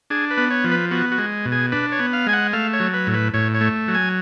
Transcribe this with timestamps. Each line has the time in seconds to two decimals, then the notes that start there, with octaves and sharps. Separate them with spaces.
0.10 D4 G#4
0.31 B4
0.37 B3
0.51 C#5
0.64 F3
0.71 B4
0.91 B3 F#4
1.12 F#4
1.18 G#3
1.45 B2
1.52 G#4
1.72 D4 B4
1.92 C#5
1.99 B3
2.13 F5
2.27 G#3 G#5
2.33 F#5
2.53 A3 F5
2.73 C#5
2.80 F#3
2.94 B4
3.07 A2
3.14 B4
3.34 A2 C#5
3.54 C#5
3.61 A3
3.88 F#3
3.95 G#5